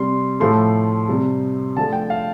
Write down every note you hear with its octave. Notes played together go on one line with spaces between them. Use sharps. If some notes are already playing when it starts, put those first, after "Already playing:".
Already playing: C3 G3 C6
A2 F3 A3 C6
C3 G3
D3 F3 A3 A5
G5
F5